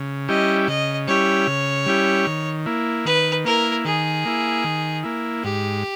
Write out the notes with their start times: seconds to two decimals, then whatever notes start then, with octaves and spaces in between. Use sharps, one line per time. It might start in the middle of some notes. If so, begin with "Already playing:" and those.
Already playing: C#3
0.28 G3 C#4 E4 G4 D#5
0.68 C#3 D#5
1.07 G3 C#4 E4 G4 C#5
1.47 C#3
1.86 G3 C#4 E4 G4
2.27 D#3
2.66 A#3 E4
3.05 D#3 B4
3.45 A#3 E4 A#4
3.85 D#3 G#4
4.25 A#3 E4
4.64 D#3
5.04 A#3 E4
5.44 G#2 G4